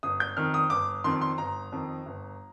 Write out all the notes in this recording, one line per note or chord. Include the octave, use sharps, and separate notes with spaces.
G1 D#6
G6
F2 D#3 F6
D#6
G1 D6
F2 D#3 C6
C6
G1 A#5
F2 D#3
G1